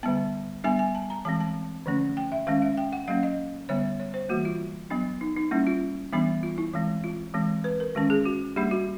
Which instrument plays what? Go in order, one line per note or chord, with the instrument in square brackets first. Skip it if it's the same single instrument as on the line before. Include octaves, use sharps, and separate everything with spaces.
[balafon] D3 G3 B3 A5
G3 B3 D4 G#5
G#5
A5
A#5
E3 G#3 C4 A5
A5
D3 F3 A3 C#4
G5
E5
D#3 G#3 C#4 F5
E5
G5
F#5
F#3 A#3 C#4 F5
D#5
D3 G3 B3 C#5
C#5
C5
E3 G3 A#3 F#4
F4
F#3 B3 D4
D#4
D#4
G3 A#3 C#4 E4
F4
E3 G3 B3 D4
F4
E4
E3 G#3 C4
F4
E3 G#3 C4
B4
A#4
D#3 G#3 C#4
G#4
F#4
G3 A#3 D4 G4
F#4